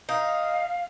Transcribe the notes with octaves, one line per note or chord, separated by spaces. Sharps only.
D#4 F5